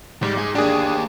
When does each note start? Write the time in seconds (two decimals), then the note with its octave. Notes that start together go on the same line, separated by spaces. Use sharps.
0.23 G#2 G3
0.38 G#4
0.55 A#3 D4 G4 G#4